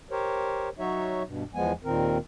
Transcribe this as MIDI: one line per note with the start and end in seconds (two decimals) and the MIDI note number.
0.11 0.69 67
0.11 0.69 70
0.11 0.69 72
0.11 0.69 73
0.79 1.23 54
0.79 1.23 63
0.79 1.23 66
0.79 1.23 73
0.79 1.23 76
1.26 1.43 43
1.26 1.43 47
1.54 1.72 40
1.54 1.72 53
1.54 1.72 56
1.54 1.72 59
1.54 1.72 80
1.84 2.18 39
1.84 2.18 46
1.84 2.18 51
1.84 2.18 60
1.84 2.18 70